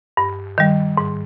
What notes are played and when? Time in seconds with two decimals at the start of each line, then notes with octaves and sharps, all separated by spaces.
0.17 G2
0.58 D#3 G3
0.97 G#2